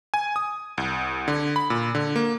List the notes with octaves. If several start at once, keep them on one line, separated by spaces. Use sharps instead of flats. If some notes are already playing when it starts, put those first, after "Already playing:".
G#5
D#6
C2
D3
B5
A#2
D3
A#3